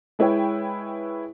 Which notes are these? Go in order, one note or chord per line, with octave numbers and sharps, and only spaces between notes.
G#3 E4 B4 C#5 G5